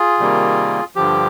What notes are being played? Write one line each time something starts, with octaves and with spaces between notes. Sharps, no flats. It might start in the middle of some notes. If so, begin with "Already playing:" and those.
Already playing: F4 G#4
C3 D#3 G3 A#3
G2 D3 F3 G4